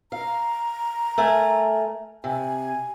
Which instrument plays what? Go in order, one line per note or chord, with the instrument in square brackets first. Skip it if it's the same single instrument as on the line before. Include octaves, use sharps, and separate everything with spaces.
[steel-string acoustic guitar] F5 [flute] A#5
[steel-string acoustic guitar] A3 A#4 G#5
[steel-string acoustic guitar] C3 [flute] G#5